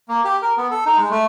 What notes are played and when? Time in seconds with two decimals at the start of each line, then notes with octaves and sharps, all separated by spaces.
0.08 A#3
0.24 G4
0.42 A#4
0.57 B3
0.71 A4
0.86 D#4
0.97 G#3
1.11 A3